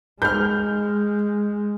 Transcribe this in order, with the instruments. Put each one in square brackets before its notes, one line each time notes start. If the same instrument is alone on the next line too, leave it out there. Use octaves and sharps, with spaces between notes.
[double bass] G#3 [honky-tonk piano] F6 G6